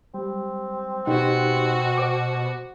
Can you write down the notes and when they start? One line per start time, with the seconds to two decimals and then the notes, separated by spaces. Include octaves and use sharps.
0.14 G3 C4
1.07 B2 D#4 F#4 G4
1.98 C5 D6